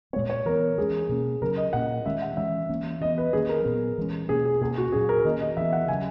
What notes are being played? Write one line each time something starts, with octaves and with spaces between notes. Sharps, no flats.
A#2 G#3 B3 C#5
C#5
E3 B3 A#4
E3 G#3 C#4 G#4
B2 A#3 C#4
C#3 F#3 C#4 A#4
D#5
A#2 A#3 C#4 F#5
D#3 G#3 C#4 E5
F#5
E3 G#3 C#4 E5
E3 A#3 C#4
E3 B3 D#5
B4
D#3 A#3 C#4 G#4
A#4
A#2 F#3 B3
E3 G#3 C#4
B2 A#3 C#4 G#4
G#4
B2 A#3 C#4 G#4
F#4
A#2 F#3 C#4 G#4
A#4
D#3 A#3 C#4 D#5
D#5
E3 B3 E5
F#5
C#3 F#3 C#4 G#5